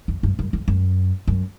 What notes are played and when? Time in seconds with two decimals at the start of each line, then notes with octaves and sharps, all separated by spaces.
0.08 F2
0.23 F#2
0.39 F#2
0.53 F2
0.68 F#2
1.28 F#2